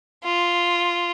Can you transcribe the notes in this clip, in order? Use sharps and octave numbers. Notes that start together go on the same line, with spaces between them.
F4